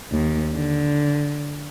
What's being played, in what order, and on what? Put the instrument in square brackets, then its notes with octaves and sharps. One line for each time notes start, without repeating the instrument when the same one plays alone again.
[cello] D#2
D3